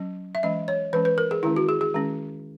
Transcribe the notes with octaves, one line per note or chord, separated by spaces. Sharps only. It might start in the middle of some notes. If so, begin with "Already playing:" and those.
Already playing: F#3 C#4
E5
E3 G#3 C#4 D#5
C#5
E3 G#3 C#4 B4
B4
A#4
G#4
D#3 G#3 C#4 E4
F#4
G#4
G#4
D#3 G#3 C#4